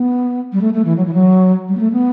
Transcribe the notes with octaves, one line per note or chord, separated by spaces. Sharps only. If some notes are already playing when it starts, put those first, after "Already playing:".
Already playing: B3
G3
A3
A3
E3
F#3
E3
F#3
G3
B3
A3
B3